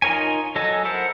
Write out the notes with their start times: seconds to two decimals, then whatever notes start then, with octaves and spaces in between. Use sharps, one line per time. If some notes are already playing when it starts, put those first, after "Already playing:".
0.02 D#4 F4 A#4 C#5 G#5
0.56 F#3 A4 D#5 G#5
0.85 E4 A4 A#4 C5 F#5